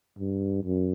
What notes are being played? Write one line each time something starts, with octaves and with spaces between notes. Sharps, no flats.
G2
F#2